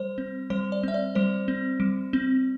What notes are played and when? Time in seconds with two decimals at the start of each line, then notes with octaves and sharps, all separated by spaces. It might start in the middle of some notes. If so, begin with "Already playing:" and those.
Already playing: G3 C5
0.18 C4
0.50 G3 C5
0.72 D5
0.83 C4 E5
0.94 D5
1.15 G3 C5
1.48 C4
1.80 G3
2.13 C4